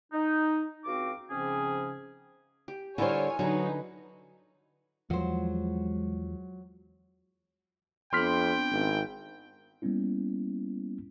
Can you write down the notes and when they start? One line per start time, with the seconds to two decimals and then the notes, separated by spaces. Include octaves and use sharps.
0.13 D#4
0.85 C#2 C4 F#4 F5 D6
1.30 G#2 C#3 F3 C4 C#4 G#4
2.68 G4
2.98 D3 G3 E4 F4 A#4 C5 C#5 G#5
3.39 D3 F#3 D#4 G#4 B4
5.10 E2 F3 F#3 G#3 C5
8.13 F2 B3 C4 D4 G5 C6 F6 B6
8.72 G#1
9.82 G3 A#3 B3 C#4 E4